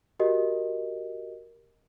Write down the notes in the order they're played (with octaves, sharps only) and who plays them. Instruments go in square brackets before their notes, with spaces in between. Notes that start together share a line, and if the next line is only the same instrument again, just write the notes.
[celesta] F#4 G4 A#4 D#5